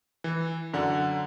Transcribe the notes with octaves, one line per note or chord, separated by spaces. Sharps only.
E3
F#2 D3 F#5